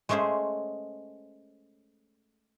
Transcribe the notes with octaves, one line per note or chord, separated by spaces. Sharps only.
G#3 A3 C#4 G#4 C5